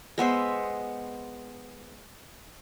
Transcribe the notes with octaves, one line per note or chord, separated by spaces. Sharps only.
G#3 B3 C5 E5